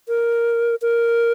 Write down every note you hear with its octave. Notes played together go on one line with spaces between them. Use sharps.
A#4
A#4